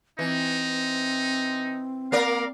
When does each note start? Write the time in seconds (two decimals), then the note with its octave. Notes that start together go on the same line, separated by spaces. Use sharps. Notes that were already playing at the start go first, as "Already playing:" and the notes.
0.19 E3 C4 D#4
2.12 A#3 A#4 D5 F5